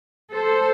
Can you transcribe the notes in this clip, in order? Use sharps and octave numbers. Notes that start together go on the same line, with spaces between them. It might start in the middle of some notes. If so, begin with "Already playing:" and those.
A4 C5